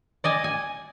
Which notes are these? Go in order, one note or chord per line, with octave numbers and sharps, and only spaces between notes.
D5 D#5 G#5
G#5